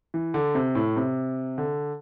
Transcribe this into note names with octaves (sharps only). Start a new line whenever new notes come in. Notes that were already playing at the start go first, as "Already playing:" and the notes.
E3
D3
C3
A2
C3
D3